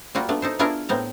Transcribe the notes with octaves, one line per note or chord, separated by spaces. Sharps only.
G3 A#3 F4 F#4
A3 B3 D4
D#4 A4 C5
B3 D4 E4 F4 G#4 A#4
A2 B3 C4 A#5